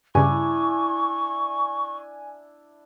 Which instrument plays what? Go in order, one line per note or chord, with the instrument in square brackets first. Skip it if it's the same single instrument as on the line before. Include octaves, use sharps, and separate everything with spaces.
[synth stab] G2 C#3 [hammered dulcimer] D4 E4 [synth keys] G#5 [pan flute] C#6